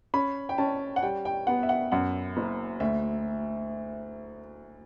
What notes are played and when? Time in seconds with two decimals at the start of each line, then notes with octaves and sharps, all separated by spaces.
0.14 C#4 B5
0.49 G5
0.58 C#4 A5
0.96 F#5
1.03 G3 G5
1.25 G5
1.47 B3 F#5
1.63 E5
1.69 F#5
1.92 F#2 F#5
2.37 F#1
2.80 D2 E5